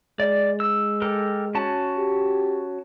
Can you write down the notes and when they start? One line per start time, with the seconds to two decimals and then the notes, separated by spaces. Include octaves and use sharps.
0.20 G#3 D5
0.60 E6
1.02 G4 A4 A#4
1.55 C#4 F#4 A5
1.98 G4